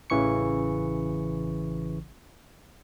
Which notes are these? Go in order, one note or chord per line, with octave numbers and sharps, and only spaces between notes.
A1 C#3 E3 C#6 C#7